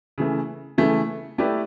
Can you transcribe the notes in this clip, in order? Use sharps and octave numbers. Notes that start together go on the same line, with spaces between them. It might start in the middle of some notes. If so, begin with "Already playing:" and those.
C#3 E3 A3
C#3 E3 A3
A3 E4 G4 B4 D5